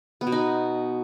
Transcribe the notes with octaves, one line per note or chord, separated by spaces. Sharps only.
B3
B2
D#4